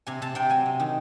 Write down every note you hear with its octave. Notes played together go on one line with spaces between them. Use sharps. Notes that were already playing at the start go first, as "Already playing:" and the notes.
C3 G#5
C3 A5
C3 G5
F#3 G#5
C3
D#3